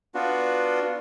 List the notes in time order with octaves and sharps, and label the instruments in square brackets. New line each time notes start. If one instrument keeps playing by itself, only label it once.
[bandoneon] B3 D4 F4 F#4